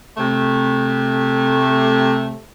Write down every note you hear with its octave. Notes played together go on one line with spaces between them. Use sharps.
C3 A3